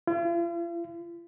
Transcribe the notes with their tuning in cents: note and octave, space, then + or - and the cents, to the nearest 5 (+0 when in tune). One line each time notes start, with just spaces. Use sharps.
F4 -45